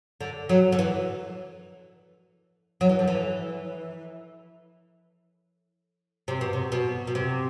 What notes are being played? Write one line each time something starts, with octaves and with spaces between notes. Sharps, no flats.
D3
F#3
D3
E3
F#3
E3
D3
E3
C3
B2
C3
B2
B2
C3